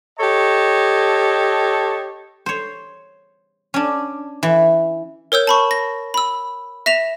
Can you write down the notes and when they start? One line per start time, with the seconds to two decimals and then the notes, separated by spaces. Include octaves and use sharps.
0.20 G4 A4 C#5 D#5 A5
2.46 C5 C#5
3.74 C#4 D4
4.43 E3
5.32 A#4 C#5 E6 G6
5.47 A5 B5 C#6
5.71 A#6
6.14 B5 E6
6.86 E5 A#6 E7 F7